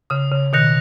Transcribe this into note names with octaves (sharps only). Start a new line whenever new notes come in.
C#3 D#6
C#3
B2 D#3 F#6 A#6 C#7 F7